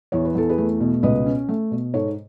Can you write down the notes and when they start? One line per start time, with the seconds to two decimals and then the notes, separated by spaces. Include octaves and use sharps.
0.12 E2 C#5
0.25 B4
0.35 E2 A4
0.49 G#4 B4
0.58 A3
0.80 B2
1.03 C#2 B4 D#5
1.26 C#4
1.49 A3
1.72 B2
1.94 G#2 A4 C#5